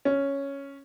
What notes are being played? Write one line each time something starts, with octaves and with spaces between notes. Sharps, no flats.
C#4